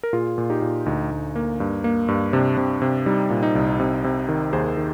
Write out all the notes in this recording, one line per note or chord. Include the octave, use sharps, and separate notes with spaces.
A#4
A#2 F4 G#4
A#2
D#4 G4
A#2
D2 D#4
D2
A#3
G2
A#3
G2
C3 D4
C3
C3
G3 D#4
A#2
D#4
C2
C3
C3
D#3
D#2 G#4 C5
D#3